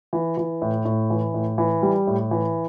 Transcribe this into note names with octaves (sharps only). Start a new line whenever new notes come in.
E3
E3
A2
A2
E3
A2
E3
G3
A2
E3